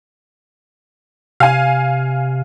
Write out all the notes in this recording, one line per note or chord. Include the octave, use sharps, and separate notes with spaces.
C3 F5 G#5